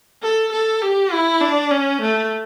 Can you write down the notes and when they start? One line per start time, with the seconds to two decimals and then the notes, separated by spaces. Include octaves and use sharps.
0.23 A4
0.52 A4
0.82 G4
1.12 E4
1.41 D4
1.71 C#4
2.01 A3